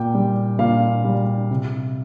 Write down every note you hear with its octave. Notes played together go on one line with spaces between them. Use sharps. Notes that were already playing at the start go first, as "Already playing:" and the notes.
Already playing: A#2 G5
G3
A#2 F5
G3
C3